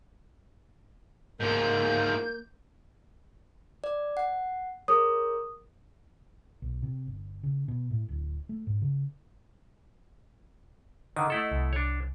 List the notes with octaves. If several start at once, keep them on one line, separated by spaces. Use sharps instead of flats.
G#2 F3 A#3 G6
D5
F#5
G#4 A#4 C#5 D#6
B1
C3
G1
C#3
B2
A2
D1
A3
G#2
C#3
D3 D#3 D#5 F#5
A3 E4 A4
C2
D4 C#5